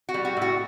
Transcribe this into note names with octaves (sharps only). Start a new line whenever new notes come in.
F#4
G3
F#4
A2 F#4